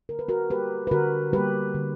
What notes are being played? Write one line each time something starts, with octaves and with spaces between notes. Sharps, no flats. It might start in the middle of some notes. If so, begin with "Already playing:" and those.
D3 A#4
B4
F#4 A#4
G3 A#3 G4 B4
B4
D3 F#4 A#4
G3 A#3 G4 B4
D3